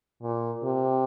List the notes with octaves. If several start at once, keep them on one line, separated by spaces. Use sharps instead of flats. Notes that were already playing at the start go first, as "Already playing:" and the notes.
A#2
C3